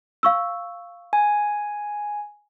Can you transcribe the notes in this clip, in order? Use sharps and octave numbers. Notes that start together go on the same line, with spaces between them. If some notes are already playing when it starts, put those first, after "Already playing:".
F5 C#6 E6
G#5